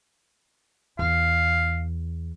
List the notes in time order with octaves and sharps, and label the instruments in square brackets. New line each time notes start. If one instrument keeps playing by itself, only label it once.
[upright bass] E2 [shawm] F5